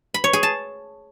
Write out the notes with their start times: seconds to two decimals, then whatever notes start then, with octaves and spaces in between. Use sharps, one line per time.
0.14 B5
0.24 C#5
0.33 G#4
0.43 A5